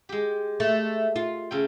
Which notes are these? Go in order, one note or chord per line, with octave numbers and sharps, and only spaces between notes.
G#3 G4
A3
F4
C#3 A3 G5